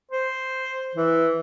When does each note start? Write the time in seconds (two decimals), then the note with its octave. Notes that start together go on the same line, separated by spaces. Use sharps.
0.11 C5
0.96 E3